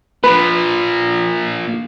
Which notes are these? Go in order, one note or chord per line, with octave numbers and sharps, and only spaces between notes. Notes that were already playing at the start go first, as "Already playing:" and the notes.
A#2 F3 B4